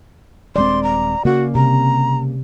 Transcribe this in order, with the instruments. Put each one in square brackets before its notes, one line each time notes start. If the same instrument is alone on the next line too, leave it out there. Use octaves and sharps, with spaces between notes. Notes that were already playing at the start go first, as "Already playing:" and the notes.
[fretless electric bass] D#1 G#3 C4 [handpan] D5 [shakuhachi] C6
[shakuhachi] A#5
[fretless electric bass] C#3 A#3 [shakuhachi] F#4
[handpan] C3 [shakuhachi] A#5